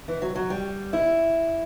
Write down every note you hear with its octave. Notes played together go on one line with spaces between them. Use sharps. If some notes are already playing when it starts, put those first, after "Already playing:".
E3
F#3
F#3
G3
E4